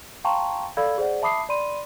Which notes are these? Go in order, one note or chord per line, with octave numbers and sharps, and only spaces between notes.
F5 G5 A5 A#5 C6 C#6
A4 D5 F5 B5 E6 G#6
G#4 C5 D5 F#5
E5 A5 B5 D6 D#6 C7
D5 B5 C6 D#7